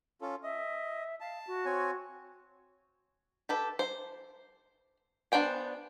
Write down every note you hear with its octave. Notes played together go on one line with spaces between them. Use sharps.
C#4 F4 A4
D#5 E5
F5 A5
F#4
C4 C#5 G#5
G4 A4 B4
C5
B3 D4 C5 G5 G#5